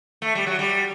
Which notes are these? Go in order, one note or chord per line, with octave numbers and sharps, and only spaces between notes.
A3
G3
F#3
G3